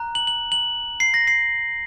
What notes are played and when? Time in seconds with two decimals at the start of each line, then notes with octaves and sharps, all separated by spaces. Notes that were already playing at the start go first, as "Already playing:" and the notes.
Already playing: A#5 F#6
0.15 F#7
0.27 F#7
0.52 F#7
1.00 C7
1.14 A#6
1.27 C7